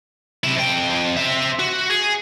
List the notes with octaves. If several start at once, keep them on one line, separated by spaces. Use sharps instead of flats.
C3 E4
F2 G5
C4 E5
F#4
G#4